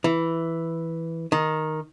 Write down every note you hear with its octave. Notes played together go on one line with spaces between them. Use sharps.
E3
D#3